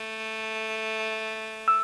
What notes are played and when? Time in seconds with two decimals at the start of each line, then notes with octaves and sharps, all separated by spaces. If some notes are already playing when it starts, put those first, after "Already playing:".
Already playing: A3
1.68 E6